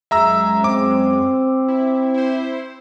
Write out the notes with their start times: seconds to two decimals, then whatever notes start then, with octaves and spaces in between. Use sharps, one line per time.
0.11 F#2 G#3 E5 A#5 E6
0.64 C4 D6
1.68 E4
2.14 E4 C5